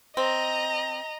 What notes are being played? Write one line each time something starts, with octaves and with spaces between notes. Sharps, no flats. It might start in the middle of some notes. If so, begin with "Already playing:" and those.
C4 D#5 A#5